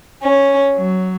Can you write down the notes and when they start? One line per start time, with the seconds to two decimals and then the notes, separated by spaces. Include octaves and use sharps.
0.23 C#4
0.74 F#3